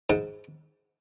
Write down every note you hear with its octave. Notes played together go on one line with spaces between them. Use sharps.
G#2